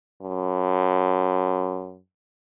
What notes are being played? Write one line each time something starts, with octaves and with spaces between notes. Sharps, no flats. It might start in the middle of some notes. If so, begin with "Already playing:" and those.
F#2